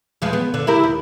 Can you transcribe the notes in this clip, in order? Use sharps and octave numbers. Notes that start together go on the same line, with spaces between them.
E2 F3 G#3
B3
D3 D4
E4 G4 A#4
D#2